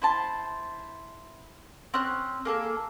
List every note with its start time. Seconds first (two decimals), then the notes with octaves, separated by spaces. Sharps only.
0.02 E4 C5 A5
1.94 C4 C#4 F#6
2.45 A#3 G#4 A4